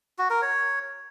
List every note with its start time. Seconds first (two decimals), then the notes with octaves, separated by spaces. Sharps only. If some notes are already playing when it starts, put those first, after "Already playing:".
0.19 F#4
0.30 A#4
0.42 C#5